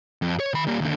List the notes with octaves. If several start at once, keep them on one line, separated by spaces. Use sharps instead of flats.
F2
C#5
D#3 B5
G3 A#3
D#2 D3